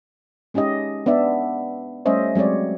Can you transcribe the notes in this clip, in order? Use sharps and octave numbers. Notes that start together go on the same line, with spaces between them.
G#3 C#4 D#4 G4 D#5
B3 D4 D5 E5
G3 A3 C#4 C5 D#5 E5
F#3 G#3 C4 C#5 D5